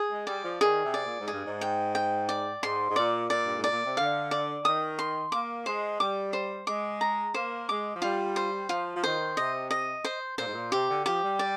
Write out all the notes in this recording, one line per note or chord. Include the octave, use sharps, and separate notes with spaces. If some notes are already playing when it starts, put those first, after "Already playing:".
Already playing: G#4
G#3
G3 D5
F3
D#3 G#4
C3
D5
A#2
G#2
G2 G#4
G#2
G5
G5
D5
G#2 C6
G#2
A#2 D5
A#2 D5
G2
G#2
D5
A#2
C3
D3 F5
D5
D#3 D#6
C6
A#3 D6
G#3 C5
G3 D6
C5
G#3 D6
A#5
A#3 C5
G#3 D6
F3
G3 F4
C5
F3 F4
F3
D#3 C5
C3 D#5
D#5
C5
A#2 C5
G#2
A#2
C3 G4
D3
F3 G4
G3
D5